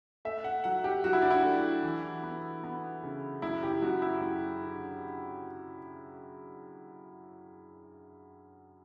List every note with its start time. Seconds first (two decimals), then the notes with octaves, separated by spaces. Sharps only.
0.25 A3 E5
0.44 F#5
0.64 F#3 F#5
0.84 G4
1.04 F#3 F#4
1.13 E4
1.22 D4
1.30 E4
1.44 A3
1.83 E3
2.23 B3
2.63 B3
3.03 C#3
3.42 F#2 E4
3.63 G4
3.82 F#2 F#4
4.02 E4
4.21 F#2
4.62 D3